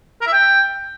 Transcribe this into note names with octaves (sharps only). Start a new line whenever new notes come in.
A#4
E5
G5